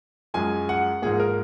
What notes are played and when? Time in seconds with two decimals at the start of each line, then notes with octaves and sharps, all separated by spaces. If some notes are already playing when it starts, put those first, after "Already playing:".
0.34 F#2 F3 G#3 G#5
0.69 F#5
1.02 G#2 F3 A#3 G#4
1.20 A#4